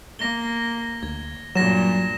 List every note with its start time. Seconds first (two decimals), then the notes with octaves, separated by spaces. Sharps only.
0.19 A#3 A#6 G7
1.03 D2 G#6
1.55 G2 A#2 F#3 A#6 E7